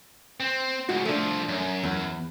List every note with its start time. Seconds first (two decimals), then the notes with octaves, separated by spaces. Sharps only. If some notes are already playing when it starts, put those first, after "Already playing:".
0.40 C4
0.89 G#2 C#3 F#4
1.05 C2 F3 A3 D4
1.49 F#2
1.84 E2